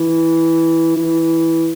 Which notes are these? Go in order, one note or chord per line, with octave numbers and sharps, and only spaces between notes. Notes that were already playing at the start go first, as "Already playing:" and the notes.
Already playing: E3
E3